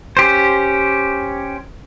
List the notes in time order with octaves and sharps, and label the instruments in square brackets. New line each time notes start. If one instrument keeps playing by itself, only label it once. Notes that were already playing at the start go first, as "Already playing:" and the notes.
[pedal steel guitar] C#4 G4 C5